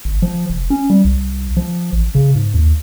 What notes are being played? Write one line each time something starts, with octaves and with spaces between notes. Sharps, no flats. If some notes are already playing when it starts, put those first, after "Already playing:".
G1
F3
F1
C#4
G3
C2
F3
A1
C#3
G#2
D#2